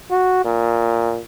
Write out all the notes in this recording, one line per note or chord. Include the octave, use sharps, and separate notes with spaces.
F#4
A#2